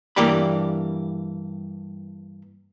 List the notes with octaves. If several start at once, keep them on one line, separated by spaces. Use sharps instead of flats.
G2 E3 A#3 G4 D5 B5